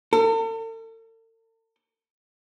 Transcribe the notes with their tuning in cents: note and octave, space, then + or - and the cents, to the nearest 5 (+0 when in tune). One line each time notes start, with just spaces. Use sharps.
A4 +45